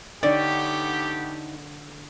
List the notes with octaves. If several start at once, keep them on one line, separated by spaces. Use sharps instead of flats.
D3 A3 B3 D#4 G4 C#5 D5